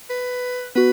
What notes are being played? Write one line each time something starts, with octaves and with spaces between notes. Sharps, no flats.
B4
B3 F#4 B4